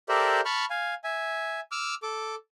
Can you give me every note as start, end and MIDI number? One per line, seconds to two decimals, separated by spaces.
0.09 0.41 67
0.09 0.41 69
0.09 0.41 70
0.09 0.41 72
0.09 0.41 74
0.09 0.41 76
0.45 0.65 81
0.45 0.65 83
0.45 0.65 85
0.45 0.65 89
0.70 0.94 77
0.70 0.94 80
1.04 1.60 76
1.04 1.60 80
1.72 1.95 86
1.72 1.95 88
1.72 1.95 89
2.03 2.35 69
2.03 2.35 86